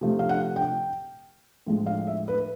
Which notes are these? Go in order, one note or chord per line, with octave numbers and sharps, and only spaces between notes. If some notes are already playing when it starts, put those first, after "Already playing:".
C3 F3 A3
F5
F#5
G5
A2 F3 G#3
F5
E5
B4